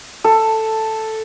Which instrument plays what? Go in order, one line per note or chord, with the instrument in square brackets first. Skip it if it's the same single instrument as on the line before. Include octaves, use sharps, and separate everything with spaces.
[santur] A4